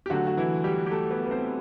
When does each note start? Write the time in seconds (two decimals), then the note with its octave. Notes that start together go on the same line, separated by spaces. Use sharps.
0.06 G4
0.10 D3 F#3 A3 F#4
0.27 F#4
0.37 E3 E4
0.64 G3 G4
0.86 G4
0.91 A3 A4
1.10 B3 B4
1.26 B4
1.31 C4 C5